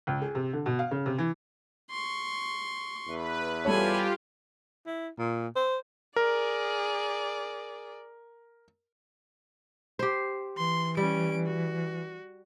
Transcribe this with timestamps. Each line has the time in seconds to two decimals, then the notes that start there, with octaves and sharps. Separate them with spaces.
0.07 C#2
0.22 G#4
0.35 C3
0.53 D3
0.66 B2
0.79 F5
0.91 C#3
1.06 C3
1.18 E3
1.90 C6 C#6
3.08 E2 B4
3.65 G3 F4 G4 A4 C#5 G#5 B5
4.86 E4
5.18 A#2
5.56 C5
6.16 G#4 A#4 D5
9.99 G4 C5
10.57 E3 C6
10.97 G3 C#4 D7
11.46 F#4